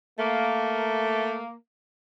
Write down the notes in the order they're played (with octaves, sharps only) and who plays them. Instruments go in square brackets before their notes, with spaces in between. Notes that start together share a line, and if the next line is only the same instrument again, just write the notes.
[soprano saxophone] A3 [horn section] A#3